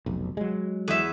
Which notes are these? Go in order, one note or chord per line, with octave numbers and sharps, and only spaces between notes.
F1 B1
F#3 G#3
E2 E5